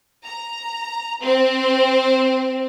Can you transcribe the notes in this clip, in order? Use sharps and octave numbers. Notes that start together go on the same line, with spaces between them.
A#5
C4